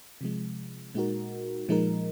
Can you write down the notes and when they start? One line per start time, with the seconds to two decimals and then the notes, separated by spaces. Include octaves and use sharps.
0.21 C3 F3 G#3
0.95 A#2 G#3 D#4 F#4 A#4
1.68 A#2 F3 G#3 D#4 A#4